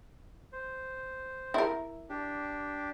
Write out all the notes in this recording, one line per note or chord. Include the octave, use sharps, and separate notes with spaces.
C5
E4 A#4
D4 G4